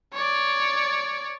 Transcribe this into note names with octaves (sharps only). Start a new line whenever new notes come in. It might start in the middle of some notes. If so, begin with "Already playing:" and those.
C#5 D5